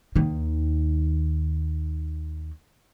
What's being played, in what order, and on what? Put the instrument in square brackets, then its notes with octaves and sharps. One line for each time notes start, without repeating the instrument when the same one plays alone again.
[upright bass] D#2 D#3